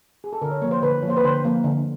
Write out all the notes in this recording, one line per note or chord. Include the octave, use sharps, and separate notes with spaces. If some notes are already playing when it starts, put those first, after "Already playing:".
G#4
A4
D3 A#4
C#5
F3 A#3 C#5
C5
D3 B4
F3 C#5
A#3 C5
B4
D3 C5
F3 A#3
D3